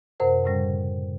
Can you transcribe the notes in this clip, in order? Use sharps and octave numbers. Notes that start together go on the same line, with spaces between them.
F#2 C3 A#4 C5 F#5
F#2 A2 C#3 G3 C#4